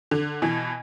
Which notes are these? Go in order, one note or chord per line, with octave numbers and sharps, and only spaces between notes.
D3
B2 E3